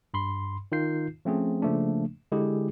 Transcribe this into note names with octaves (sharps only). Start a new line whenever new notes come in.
G2 B5 C6
D#3 D#4 F4 G6 C7
F3 A3 C4 C#4 G#4
C#3 F3 A3 A#3 D4
D3 G#3 E4 G4 G#4